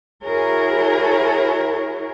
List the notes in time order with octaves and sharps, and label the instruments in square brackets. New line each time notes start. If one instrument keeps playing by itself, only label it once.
[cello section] E4 F#4 G#4 A#4 C#5